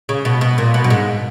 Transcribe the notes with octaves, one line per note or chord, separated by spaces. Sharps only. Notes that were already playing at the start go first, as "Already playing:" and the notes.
C#3
B2
B2
A#2
B2
F#2
G#2